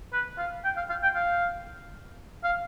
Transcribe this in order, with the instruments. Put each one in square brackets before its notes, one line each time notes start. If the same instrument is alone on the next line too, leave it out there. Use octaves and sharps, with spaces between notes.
[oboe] B4
F5
G5
F5
F5
G5
F5
F5